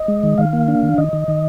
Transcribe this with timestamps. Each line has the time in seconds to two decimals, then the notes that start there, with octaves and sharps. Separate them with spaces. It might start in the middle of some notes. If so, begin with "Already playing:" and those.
Already playing: D#5
0.08 G#3
0.23 D#3
0.38 D#3 F5
0.53 A#3
0.68 D4
0.83 D#3
0.98 D#3 D#5
1.13 D#3
1.28 D#3